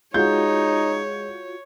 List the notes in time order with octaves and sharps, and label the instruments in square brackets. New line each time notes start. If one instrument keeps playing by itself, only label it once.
[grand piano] G#3 G6 [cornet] D#4 [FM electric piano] F4 F#4 [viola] C#5